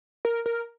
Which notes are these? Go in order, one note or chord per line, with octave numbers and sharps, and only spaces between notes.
A#4
A#4